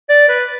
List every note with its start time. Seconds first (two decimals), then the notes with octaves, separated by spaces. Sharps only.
0.09 D5
0.28 B4